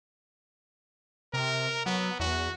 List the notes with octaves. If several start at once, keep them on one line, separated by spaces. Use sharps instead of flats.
C3 A#4
F#3 B3
E2 F#4